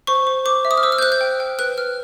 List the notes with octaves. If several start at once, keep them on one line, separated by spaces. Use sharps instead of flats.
C5 C#6
C5
C5 D6
E5
D#6
F6
C5 E6
F6
G6
C5 F#6
G6
G5
G5
B4 F#6
B4 F6